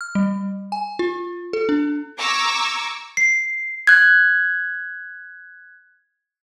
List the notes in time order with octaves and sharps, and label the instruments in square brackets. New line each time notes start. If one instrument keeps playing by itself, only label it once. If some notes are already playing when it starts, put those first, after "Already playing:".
[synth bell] F6
G3
G#5
F4
A4
D4
[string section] A#5 C#6 D6 E6 G#6
[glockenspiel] C7
[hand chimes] F#6 G#6